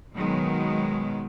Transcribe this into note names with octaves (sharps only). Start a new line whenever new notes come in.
B2 D#3 F#3 G#3 B3